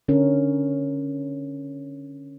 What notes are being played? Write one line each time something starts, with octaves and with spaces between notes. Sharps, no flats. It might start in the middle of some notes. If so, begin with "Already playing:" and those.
D3 C#4 A#4